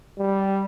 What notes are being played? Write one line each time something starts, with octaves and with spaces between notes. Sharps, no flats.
G3